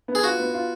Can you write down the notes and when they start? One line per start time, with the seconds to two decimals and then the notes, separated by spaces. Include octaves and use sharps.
0.08 B3
0.15 G#4
0.23 F4 F#4
0.39 B3
0.54 F4